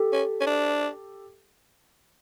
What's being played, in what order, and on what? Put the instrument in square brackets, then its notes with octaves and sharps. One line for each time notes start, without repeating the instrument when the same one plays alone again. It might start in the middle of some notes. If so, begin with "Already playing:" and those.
Already playing: [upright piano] G4 A4
[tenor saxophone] C#4
C#4
D4